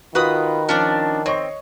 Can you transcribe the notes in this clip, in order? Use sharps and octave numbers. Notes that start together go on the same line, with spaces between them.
D#3 F4 F#4 B4 B5 D#6
F3 C#4 D4 D5 A5
C4 C#5 D#5 C#6